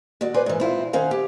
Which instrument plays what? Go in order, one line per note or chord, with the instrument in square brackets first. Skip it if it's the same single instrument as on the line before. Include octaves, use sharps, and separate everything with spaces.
[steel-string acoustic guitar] D#2 F#4 D5
B4 C5 D5 G#5
G#2 E3
C4 E4 F4
D#3 C#4 C5 F5 F#5
G4